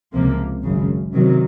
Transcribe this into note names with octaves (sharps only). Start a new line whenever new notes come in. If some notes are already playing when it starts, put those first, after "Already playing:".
C#2 C3 F3 A#3
G#1 F#2 C#3
C3 D#3 F#3